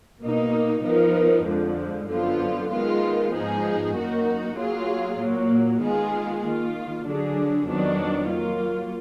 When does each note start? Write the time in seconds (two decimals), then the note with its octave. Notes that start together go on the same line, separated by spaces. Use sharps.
0.22 B2 A#3 D#4
0.84 F3 B3 D#4 A#4
1.45 F2 D3 F3 G#3
2.08 F#2 D3 F3 B3 F4
2.71 D#3 G#3 B3 F4
3.32 G#2 F3 B3 D#4 G#4
3.94 F#2 D#3 A#3 D#4 F#4
4.56 F#3 A#3 F4 G#4
5.19 A#2 F#3 A#3
5.80 D#3 G#3 B3 F4 G#4
6.42 D#3 A#3 F4
7.05 D3 F#3 D4 G#4
7.67 F2 D#3 F#3 B3 D4
8.29 F#3 A#3 F4